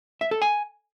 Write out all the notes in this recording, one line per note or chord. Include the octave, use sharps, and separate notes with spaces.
E5
A4
G#5